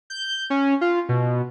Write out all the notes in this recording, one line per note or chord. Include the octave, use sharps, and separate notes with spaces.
G6
C#4
F4
B2